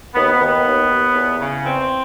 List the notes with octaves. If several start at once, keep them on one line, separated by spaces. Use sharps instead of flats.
D#2 B3
B3
D#2
B3
D#2
D#2
E2
C#3
E2 C4